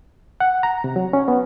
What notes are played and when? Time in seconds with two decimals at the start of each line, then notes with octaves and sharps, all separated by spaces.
0.40 F#5
0.63 A#5
0.84 C3
0.96 F#3
1.13 C#4
1.28 B3